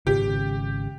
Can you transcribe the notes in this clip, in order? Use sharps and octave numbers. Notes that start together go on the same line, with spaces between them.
G#1 C#3 G4